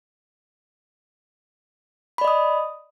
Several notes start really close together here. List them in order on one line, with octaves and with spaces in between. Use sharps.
B5 D5 D#5 D#6